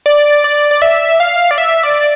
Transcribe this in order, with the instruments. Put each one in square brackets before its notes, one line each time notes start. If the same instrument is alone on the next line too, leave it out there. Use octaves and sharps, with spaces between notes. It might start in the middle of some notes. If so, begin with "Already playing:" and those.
[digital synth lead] D5
D5
D5
E5
F5
D5
E5
D5